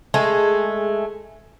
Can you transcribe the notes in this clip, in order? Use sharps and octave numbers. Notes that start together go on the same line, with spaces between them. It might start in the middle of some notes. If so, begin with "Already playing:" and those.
G#3 A3